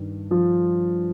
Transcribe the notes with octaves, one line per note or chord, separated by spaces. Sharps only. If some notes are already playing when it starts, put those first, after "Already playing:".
Already playing: G2 D#3
F3 F4